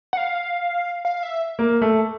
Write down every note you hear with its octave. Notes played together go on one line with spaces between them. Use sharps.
F#5
F5
F5
E5
A#3
A3